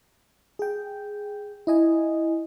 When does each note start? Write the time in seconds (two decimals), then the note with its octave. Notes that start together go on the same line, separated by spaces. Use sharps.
0.59 G#4 G5
1.67 E4 D#5 G#5